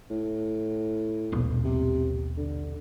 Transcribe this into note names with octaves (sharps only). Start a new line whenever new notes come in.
A2
D#1 A#1 B2
C3
D3